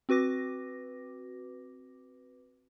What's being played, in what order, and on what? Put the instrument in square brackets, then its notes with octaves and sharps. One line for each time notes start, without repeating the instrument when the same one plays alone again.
[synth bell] C4 F#4 B4 D6 A#6